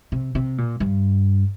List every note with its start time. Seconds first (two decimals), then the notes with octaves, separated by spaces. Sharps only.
0.12 C3
0.35 C3
0.58 A#2
0.80 G2